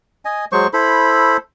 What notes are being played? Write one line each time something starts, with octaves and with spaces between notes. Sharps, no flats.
D#5 G#5
F#3 G#3 C5 C#6
E4 A4 C5 B5